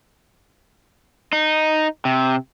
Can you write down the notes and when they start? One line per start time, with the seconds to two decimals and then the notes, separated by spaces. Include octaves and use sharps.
1.33 D#4
2.05 C3